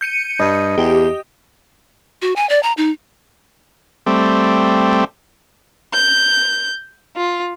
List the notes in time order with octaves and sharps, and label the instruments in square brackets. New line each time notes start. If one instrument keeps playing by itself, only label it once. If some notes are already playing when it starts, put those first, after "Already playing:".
[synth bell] G6 C#7 D#7
[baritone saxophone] G2 [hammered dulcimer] D#5
[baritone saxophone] E2 [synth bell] G4
[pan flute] F#4
G#5
D5
A#5
D#4
[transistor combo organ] G3 A3 C4
[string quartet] G6
F4